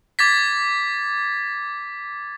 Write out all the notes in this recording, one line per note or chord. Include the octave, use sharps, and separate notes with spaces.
D6 G#6 A6 B6